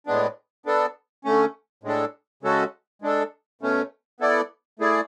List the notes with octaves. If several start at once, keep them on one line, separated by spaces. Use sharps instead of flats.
A2 G#3 B3 D4
B3 D4 A4
D3 A3 C#4
A2 G#3 D4 A4
C#3 G#3 C#4 F#4 A4
G#3 D4 A4
B2 A3 C#4
B3 E4 A4 D5
A3 E4 G#4 D5